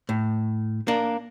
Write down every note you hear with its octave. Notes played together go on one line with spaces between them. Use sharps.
A2
A#3 D4